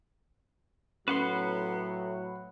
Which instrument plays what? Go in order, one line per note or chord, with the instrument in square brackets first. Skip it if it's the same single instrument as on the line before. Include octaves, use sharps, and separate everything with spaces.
[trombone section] A2 F#3 [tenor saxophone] B3 [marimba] C#4 [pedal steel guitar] B4 F#5 C6